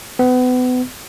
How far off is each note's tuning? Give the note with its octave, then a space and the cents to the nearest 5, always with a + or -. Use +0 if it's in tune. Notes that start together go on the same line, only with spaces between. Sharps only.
B3 +30